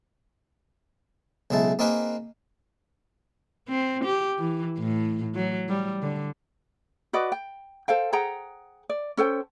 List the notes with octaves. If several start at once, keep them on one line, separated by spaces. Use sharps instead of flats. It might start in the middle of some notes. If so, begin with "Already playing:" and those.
B1 C#3 G#3 E4 A5
A#3 C4 D#4 G#4 A#4 B4
C4
G4
E3
A2
F#3
G3
D3
F#4 B4 D5 D#5
G5
A4 C5 F5 G5
G#4 F#5 G5 A#5
D5
C#4 A4 C5 G5